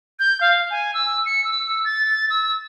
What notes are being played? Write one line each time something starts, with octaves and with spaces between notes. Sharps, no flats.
G6
F5
G#5
E6
C#7
E6
A6
E6